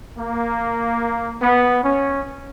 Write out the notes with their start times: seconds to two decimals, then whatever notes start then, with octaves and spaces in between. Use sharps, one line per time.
0.19 A#3
1.42 B3
1.84 C#4